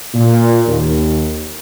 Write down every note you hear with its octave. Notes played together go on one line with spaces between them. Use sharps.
A#2
D#2